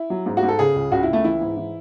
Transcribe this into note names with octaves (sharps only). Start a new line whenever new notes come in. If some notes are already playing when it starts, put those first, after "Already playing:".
Already playing: E4
F#3
G#2
F#4
G#2
A4
C#3 G#4
C#2
C#2 F#4
C#2 E4
A3
E3 E4
G#2
E3